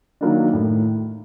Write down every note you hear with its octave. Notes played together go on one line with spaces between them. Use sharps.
D#3 F#3 A#3 D4
A2